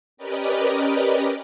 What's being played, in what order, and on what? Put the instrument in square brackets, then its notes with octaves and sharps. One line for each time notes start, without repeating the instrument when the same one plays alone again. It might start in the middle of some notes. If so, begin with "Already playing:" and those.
[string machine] C#4 G4 A#4 B4 D5 D#5